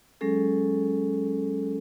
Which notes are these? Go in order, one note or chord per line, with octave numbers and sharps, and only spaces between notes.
F#3 G#3 C#4 G#4 A4